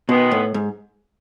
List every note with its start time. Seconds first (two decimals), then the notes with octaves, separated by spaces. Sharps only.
0.09 B2 D#3 G#3 B3
0.31 A2
0.54 G#2